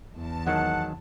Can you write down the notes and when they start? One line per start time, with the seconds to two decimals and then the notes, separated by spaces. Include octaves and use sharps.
0.17 E2 A5
0.46 D#3 F#3 G#3 F#5